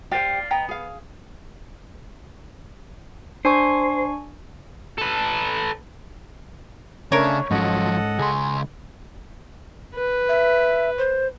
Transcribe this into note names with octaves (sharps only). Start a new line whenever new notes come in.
G4 C5 D5 F5 G5
B3 D#5 G5 A#5
G#4 F5
D4 C5 G#5 C#6
A4 B4
C#3 A3 C#4 D4 A#4 C#5
G#2 F3 F#3 C#4 A4 D#5 F#5
C#2 G#4 C6
B4
E5
C5